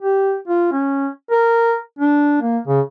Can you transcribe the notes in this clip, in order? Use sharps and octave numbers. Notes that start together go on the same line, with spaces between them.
G4
F4
C#4
A#4
D4
A#3
C#3